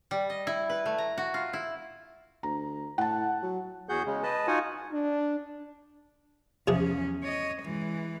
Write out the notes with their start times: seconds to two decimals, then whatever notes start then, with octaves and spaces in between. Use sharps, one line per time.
0.11 G3
0.30 D#5
0.47 E4
0.70 B4
0.86 A3
0.98 A#5
1.18 F#4
1.34 F4
1.53 E4
2.43 D2 A#5
2.98 A2 F#5 A5
3.42 F#3
3.89 E2 F#4 G#4 F#5 G6
4.06 C#3 G#3
4.23 B4 D#5 A5
4.47 D#4 F4 F#4 F#5 G#5
4.92 D4
6.68 E2 C3 F3 C#4 G#4
7.24 C#5 D#5
7.62 E3 G#3